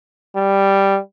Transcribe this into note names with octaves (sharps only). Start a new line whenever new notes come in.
G3